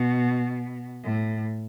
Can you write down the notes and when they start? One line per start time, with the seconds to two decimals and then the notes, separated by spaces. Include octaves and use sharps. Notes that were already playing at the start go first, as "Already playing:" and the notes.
Already playing: B2
1.03 A2